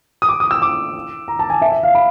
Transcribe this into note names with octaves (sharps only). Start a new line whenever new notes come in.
D#6
D6
D#6
E6
D6
A#5
A5
G#5
E5
E5
F5
B5